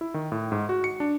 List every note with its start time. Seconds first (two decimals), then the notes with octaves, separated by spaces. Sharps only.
0.01 E4
0.14 D#3
0.32 A2
0.52 G#2
0.69 F#4
0.84 C#7
1.00 D4